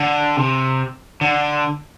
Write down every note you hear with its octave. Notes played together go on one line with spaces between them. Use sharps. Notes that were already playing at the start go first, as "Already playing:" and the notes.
Already playing: D3
C3
D3